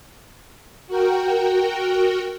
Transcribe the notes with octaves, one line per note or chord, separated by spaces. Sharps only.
F#4 A#4 G5